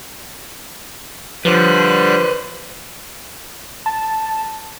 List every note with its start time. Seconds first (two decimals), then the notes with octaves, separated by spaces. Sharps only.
1.45 D3 F3 G3 B4 C5 F#6
3.86 A5